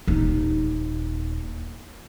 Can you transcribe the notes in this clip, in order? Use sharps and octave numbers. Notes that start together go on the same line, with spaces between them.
D#1 D#4